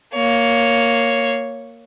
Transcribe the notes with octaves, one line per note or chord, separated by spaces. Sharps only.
A#3 C#5